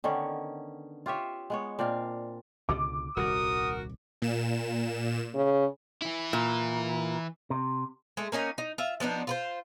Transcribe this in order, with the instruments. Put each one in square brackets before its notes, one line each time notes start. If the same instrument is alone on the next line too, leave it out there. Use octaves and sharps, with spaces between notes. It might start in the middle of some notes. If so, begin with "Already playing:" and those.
[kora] D3 D#3 B3 C#4
F4 G4 C#5 E5
G#3 B3 C#5
A#2 C4 D4 F5
[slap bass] C#2 B2 D3 [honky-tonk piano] D6
[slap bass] D#1 C2 D#3 [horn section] F#4 A#4 [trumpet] D#6
[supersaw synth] A#2 E7
[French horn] C#3
[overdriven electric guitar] E3 E4
[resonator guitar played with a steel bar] A#2
[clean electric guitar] C3
[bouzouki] G#3 A3
A#3 C#4 D#4 G#5
D#4
F4 E5
F3 B3 D4 D#4
F4 B4 C5